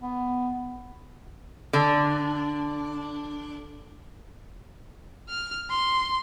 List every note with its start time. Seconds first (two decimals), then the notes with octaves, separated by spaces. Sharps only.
0.01 B3
1.73 D3 D4
5.29 F6
5.70 C6